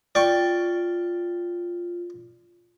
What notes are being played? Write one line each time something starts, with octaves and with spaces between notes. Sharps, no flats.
F4 D5 G5 C#6